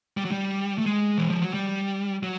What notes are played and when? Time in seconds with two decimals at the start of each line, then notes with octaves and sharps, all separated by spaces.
0.17 G3
0.25 F#3
0.32 G3
0.78 A3
0.86 G#3
1.18 E3
1.30 F3
1.42 F#3
1.54 G3
2.23 F#3